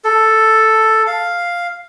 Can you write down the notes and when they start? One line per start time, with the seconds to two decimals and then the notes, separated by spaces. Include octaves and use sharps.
0.04 A4
1.07 F5